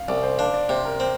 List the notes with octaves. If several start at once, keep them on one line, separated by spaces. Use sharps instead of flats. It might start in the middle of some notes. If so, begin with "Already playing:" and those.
Already playing: F5
C2 D5
C5
D4 F5
D5
C3 C5
A#4
C4